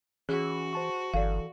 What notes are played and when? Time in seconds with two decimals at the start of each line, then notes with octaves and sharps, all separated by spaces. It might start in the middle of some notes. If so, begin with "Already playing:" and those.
0.29 E3 C#4 F#4 G#4
0.73 C5 A5 C#6
1.14 G1 E3 A4 D5 F5